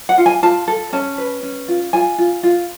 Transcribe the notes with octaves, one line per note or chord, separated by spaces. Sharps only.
F#5
F4
G#5
F4 A5
A4
C#4 A5
B4
C#4
F4
F4 G#5
F4
F4